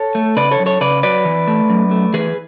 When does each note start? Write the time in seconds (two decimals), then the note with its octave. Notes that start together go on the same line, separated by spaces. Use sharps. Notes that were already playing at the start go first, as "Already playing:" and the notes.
Already playing: A4 C#5
0.15 A3
0.37 C#3 B4 D5
0.51 A4 C#5
0.59 F#2
0.66 A4 C#5
0.81 C#3 B4 D5
1.03 F#3 B4 D5
1.25 E3
1.48 A3
1.70 F#2
1.91 A3
2.14 E3 G#4 B4